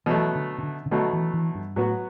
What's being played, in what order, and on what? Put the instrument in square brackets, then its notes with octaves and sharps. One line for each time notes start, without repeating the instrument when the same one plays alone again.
[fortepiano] B2 F#3 A3 [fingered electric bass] E3
[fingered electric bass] D3
C#3
D3
C#3
[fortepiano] B2 F#3 A3 [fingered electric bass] D3
[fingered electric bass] E3
E3
G2
[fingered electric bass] A2 [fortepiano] F#3 B3 F#4